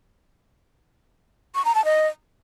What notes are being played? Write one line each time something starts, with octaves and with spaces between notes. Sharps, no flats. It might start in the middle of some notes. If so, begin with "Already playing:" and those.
C#6
A#5
A5
D#5